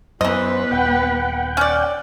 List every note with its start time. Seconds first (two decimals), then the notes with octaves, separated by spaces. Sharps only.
0.21 F#2 E3 B3 B4 C5 D#5
0.71 D#1 F#5 G5
1.57 C#4 D5